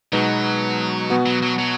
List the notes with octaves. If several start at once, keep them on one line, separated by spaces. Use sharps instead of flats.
B2 F#3 G#3 B3 D#4 B4
B2 B3 F#4
F#3
F#3
F#3